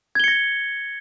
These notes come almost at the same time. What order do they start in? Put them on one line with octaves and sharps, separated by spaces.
G#6 G7 C#7 A#6